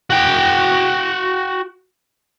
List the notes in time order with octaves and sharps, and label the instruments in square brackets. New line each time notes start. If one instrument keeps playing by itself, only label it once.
[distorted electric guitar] F#4 G5